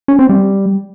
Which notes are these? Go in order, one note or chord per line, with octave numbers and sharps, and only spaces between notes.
C#4
C4
G3